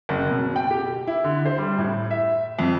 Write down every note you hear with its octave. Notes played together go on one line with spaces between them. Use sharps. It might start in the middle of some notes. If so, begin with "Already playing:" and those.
F#1
B2
G5
G4
E4
D3
C5
G3
A2
E5
F2